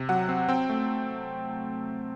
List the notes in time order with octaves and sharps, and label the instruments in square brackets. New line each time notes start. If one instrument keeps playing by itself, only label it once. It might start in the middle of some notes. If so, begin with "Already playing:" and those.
Already playing: [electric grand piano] C3
F#3 F#5
C4
C4 G5
A3